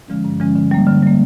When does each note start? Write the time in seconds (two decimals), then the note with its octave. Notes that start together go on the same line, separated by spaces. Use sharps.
0.08 D3 F3 G#3 C#4
0.24 G2
0.40 D3 F3 G#3 C#4
0.56 D3
0.71 G3 A#3
0.87 D3
1.02 G3 A#3